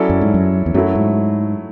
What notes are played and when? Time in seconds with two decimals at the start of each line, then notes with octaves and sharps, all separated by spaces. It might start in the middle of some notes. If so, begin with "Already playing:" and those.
Already playing: F#3 C#4 E4 A4 D5
0.10 F#2
0.21 G#2
0.34 F#2
0.66 E2
0.74 F#2 F#3 A3 E4
0.95 G#2